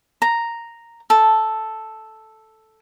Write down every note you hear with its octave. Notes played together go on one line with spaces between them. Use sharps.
A#5
A4